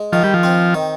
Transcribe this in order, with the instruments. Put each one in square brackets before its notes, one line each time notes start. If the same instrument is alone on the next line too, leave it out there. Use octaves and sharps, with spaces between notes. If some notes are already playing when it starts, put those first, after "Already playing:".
Already playing: [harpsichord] G#3
[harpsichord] D#3 [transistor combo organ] F3
[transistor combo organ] G3
F3
[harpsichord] C4
D#3